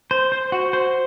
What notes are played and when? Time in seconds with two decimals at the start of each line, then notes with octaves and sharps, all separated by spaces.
0.11 C5
0.32 C5
0.52 F#4
0.73 C5